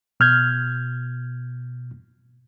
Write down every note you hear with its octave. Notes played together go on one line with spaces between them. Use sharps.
B2 F6 G6 G#6